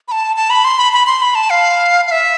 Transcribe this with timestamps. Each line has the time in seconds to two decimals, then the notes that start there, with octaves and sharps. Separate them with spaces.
0.08 B5
0.12 A5
0.36 A5
0.50 B5
0.64 C6
0.79 B5
0.93 B5
1.07 C6
1.22 B5
1.35 A5
1.50 F5
2.07 F5
2.11 E5